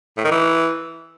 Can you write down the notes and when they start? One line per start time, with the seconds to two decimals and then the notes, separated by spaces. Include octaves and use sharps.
0.17 A2
0.24 D#3
0.31 E3